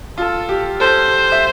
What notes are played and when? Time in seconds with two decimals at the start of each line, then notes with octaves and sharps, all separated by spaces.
0.18 F4 A4
0.49 G4
0.80 A4 C5
1.32 E5